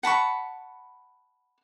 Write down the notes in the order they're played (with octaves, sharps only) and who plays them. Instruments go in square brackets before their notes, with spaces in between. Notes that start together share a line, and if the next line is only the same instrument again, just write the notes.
[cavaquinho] F#5 A5 B5 C#6